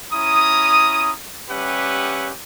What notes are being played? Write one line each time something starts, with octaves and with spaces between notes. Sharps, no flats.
C#4 E4 A#5 D#6
G3 C#4 G4 B4 E5 F#5